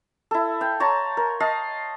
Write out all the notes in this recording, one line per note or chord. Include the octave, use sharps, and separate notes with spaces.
E4 A4
F5 G5
C#5 A5 A#5 C6
A#4
D#5 F5 A5